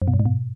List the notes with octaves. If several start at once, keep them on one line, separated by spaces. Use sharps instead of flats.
F#2
B2
G2
G#2
B2